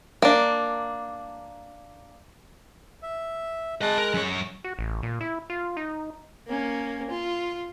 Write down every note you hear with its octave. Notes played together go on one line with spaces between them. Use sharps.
A#3 D4
E5
G#3 D#5 A5 F#6
A#4
F#2 C#5
F#4
A1
A#2
E4
F4
D#4
A#3 C#4
F4